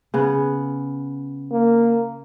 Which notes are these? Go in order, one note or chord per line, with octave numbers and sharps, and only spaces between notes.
C#3 B3
A#3